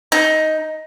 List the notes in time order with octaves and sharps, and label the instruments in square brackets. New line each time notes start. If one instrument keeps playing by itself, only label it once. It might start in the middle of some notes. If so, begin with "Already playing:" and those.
[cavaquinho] D#4